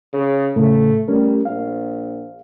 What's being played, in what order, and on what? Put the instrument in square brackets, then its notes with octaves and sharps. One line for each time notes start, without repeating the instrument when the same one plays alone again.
[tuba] C#3
[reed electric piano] A2 C#3 [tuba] A3
[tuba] G3 [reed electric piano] A3 C#4 A#4
[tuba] A#1 [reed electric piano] F5